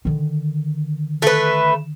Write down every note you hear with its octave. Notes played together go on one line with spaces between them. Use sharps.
D3 D#3
A3 B4